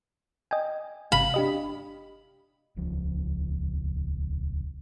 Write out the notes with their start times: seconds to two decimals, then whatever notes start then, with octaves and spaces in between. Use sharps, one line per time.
0.51 D#5 G5 G#5
1.12 G1 C3 F5 B5
1.34 D4 G4 D#5
2.76 D#1 C#2 F3